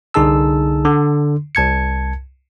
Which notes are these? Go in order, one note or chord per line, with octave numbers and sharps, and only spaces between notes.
C2 D3 D#4 G#4 A5 E6
D3
C2 A5 G#6 C#7